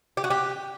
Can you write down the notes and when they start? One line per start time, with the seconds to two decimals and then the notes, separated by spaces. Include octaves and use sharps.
0.17 G4
0.24 F#4
0.30 G4